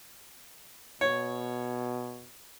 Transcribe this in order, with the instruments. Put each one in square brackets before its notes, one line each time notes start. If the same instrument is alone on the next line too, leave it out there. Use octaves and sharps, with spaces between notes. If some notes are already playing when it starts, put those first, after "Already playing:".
[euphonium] B2 [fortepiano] C#5